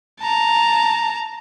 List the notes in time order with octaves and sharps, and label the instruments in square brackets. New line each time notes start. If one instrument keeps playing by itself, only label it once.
[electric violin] A5 A#5